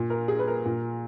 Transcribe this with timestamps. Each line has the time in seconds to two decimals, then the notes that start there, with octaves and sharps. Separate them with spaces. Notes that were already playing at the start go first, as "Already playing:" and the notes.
Already playing: A#2
0.10 A#4
0.28 G#4
0.39 B4
0.48 A#4
0.65 A#2